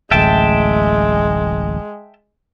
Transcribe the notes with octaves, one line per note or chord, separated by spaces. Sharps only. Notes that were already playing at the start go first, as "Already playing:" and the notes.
D1 A1 G#3 E5 G5 A5